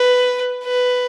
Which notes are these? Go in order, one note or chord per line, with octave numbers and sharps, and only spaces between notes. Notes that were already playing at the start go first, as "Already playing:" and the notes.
Already playing: B4
B4